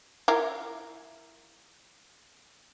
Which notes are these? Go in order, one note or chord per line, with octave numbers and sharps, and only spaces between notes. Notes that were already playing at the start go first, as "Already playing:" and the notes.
E4 F4 A#4